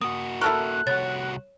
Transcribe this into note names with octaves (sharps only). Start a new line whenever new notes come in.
A#3 F#4 D#6
E4 A4 A#4 C#6 F#6
C2 F#4 C#5 A6